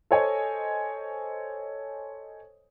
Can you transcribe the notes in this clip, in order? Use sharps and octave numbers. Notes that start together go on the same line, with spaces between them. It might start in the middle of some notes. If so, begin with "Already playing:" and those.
A4 C5 C#5 D#5 G#5